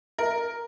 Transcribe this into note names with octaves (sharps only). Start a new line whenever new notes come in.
A#4